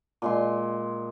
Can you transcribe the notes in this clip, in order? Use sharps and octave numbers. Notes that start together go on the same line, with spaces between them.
A#2 G#3 C6